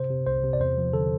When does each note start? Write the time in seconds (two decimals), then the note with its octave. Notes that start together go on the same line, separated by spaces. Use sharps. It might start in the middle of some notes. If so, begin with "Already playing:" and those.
Already playing: C3 C5
0.10 C3
0.26 C2 C5
0.43 C3
0.53 D5
0.60 E2 C5
0.78 F3
0.93 D3 A4